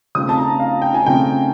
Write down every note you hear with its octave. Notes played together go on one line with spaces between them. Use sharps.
C#3 F3 A3 C4 D#6
A5
A#5
F5
G5
G#5
C#3 F3 A3 C4 G5